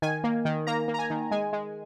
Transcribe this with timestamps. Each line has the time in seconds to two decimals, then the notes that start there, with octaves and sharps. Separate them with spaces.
0.02 D#3 G#5
0.24 A#3
0.45 D#3
0.67 A#3 A#5
0.88 A#3
0.94 A#5
0.99 G#5
1.10 D#3
1.31 G#3 G#5
1.53 G#3